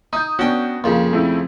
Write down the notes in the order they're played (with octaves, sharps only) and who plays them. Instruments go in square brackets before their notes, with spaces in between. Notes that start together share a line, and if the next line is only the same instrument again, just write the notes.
[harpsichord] D#4 [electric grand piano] D#6 G6
[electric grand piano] B3 D4 F#4 [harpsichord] C#4 G5
[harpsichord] F2 C#3 [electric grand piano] A#3
[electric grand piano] A3 C4 E4